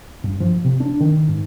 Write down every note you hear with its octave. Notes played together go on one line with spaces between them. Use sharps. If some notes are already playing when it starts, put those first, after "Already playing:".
G2
F3
C3
D4
D#3
G#2